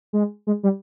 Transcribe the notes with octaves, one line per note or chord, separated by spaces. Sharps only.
G#3
G#3
G3